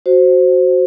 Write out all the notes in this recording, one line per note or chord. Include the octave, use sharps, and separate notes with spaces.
F#4 C5